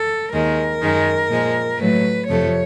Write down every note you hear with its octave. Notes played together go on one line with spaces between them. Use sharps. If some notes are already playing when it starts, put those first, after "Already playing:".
Already playing: A4
D#2 D#3 G#3 A#4
F#2 D#3 G#3
A#2 F3 G#3
A2 F#3 A3 B4
F2 C3 F3 A3 C#5